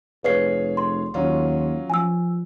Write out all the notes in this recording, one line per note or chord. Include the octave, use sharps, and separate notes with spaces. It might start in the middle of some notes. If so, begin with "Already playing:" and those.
F1 G#4 B4 C#5 F5 C7
C6
D#2 F#3 C#4 F4
F3 G#5 E6